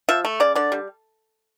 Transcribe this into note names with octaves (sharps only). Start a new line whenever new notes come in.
F3 E5
A3
C#3 D5
D3 D5
G3